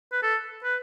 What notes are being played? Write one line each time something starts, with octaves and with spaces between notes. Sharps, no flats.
B4
A4
B4